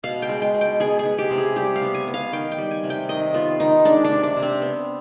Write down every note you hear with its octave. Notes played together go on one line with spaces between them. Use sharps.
B2 F5
G5
G#3
G5
B2
G5
B3 G#4
G#4
B3
G4
C3
G#4
G3 G4
F5
B3
G#5
B3
F5
D#3 G5
G5
G3
G#5
C3
G5
D#3 D#5
B3 F4
D#3 D#4
G#3 D4
D4
C3
D4
C3
C4
B3